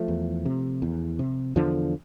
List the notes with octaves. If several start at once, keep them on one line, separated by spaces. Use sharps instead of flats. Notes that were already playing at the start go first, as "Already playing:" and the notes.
Already playing: F3 A3
E2
C3
E2
C3
E2 D3 F3